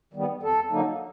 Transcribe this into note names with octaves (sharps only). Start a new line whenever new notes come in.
D#3 G3 B3
F2 A4
D3 F#3 A#3 D#4